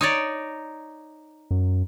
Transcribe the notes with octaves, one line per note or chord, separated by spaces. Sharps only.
D#4 C#5 D5
F#2